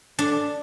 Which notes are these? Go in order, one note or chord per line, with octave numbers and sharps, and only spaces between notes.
D4